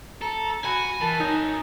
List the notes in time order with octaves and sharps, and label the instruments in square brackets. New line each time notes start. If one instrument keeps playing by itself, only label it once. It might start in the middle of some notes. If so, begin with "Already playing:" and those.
[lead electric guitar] A4 [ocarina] A#5
[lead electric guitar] F#4 [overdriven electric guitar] G#5 [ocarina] B5
[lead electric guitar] E3 [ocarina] A#4 [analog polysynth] A5
[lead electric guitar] F#2 C#4 [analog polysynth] D#4